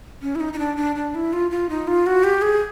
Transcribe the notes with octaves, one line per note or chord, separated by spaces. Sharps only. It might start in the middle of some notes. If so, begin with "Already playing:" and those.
C#4
E4
D#4
D#4
D4
D4
D4
E4
F4
F4
D#4
F4
F#4
G4
G#4